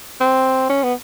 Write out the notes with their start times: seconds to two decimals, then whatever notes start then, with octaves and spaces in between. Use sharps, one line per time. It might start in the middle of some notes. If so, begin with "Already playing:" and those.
0.21 C4
0.69 C#4
0.83 B3